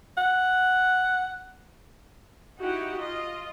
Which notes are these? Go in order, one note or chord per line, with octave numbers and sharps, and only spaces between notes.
F#5
D#4 E4 F#4 G4 F#5
F4 D#5